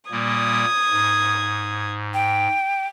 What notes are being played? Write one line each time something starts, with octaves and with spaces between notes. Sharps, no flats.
A#2 G3 A#3 D#6 G#6
G#2
G5